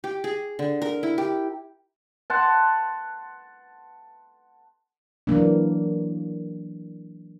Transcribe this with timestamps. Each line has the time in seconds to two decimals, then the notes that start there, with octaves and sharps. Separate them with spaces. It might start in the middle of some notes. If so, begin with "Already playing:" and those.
0.04 G4
0.24 G#4
0.59 D3
0.82 A#4
1.03 E4
1.18 G4
2.30 F#5 A5 C6
5.27 E3 F#3 A#3 D4